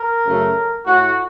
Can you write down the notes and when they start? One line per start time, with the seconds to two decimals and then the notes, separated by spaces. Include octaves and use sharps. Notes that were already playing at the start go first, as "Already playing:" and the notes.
Already playing: A#4
0.25 F#2 C#3 A3
0.85 A2 A3 F#4